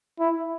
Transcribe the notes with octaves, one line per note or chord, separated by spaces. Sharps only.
E4